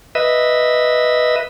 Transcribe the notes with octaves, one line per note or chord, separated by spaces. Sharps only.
B4 D#5 E5